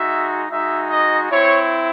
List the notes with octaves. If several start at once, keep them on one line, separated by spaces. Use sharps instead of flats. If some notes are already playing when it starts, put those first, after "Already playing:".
Already playing: G#3 D#4 F#4 E5
G#3 D#4 F#4 E5
D#5
C4 E4 C#5